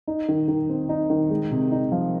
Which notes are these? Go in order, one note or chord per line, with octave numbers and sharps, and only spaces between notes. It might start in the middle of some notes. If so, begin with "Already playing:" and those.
D#4
D#3
D#3
C4
D#4
D#3
G#3
C3
D#4
F3